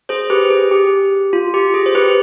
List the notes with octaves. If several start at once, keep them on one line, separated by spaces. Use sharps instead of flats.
G#4 C5
G4 B4
G#4
G4
F4
G4
G#4
C5
G4 B4